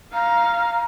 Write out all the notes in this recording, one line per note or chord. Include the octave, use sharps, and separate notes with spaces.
F5 A#5